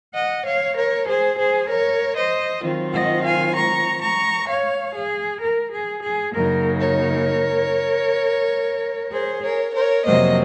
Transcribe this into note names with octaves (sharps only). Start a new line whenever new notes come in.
D#5 F#5
C#5 F5
A#4 C#5
G#4 C5
G#4 C5
A#4 C#5
C5 D#5
D#3 F#3 C4 F4
D#5 F#5
F5 G#5
A#5 C#6
A#5 C#6
C#5 F5
G#4
A#4
G#4
G#4
F#2 C#3 F#3 A#3 D#4 A#4
A#4 C#5
G#4 C5
A#4 C#5
A#4 C#5
F2 C3 F#3 A#3 C5 D#5